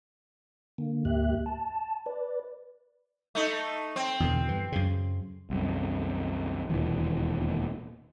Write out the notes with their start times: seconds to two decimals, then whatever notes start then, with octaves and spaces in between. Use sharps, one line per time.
0.78 D3 A#3
1.05 D2 G#2 A#3 G4 E5 F#6
1.46 A5
2.06 B4 D5
3.35 A3 D#4
3.96 C4
4.20 E2 B2 D3
4.47 G2 E3
4.72 F#2 C#3
5.50 C2 F#2
6.69 E1 D#2 A#2 E3